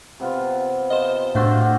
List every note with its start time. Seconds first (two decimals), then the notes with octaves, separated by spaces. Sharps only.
0.20 C3 B3 F4
0.90 F4 C5 D#5
1.35 A2 A3 D4 F4 F#4 C5
1.61 F#4 G4